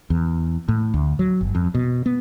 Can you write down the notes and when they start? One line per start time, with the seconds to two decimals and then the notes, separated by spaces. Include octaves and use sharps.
0.10 E2
0.68 A2
0.94 D2
1.19 F#3
1.41 G1
1.55 F2
1.75 B2
2.06 B3